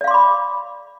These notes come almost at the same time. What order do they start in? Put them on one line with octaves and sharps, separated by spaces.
D5 F5 C6 D6 B5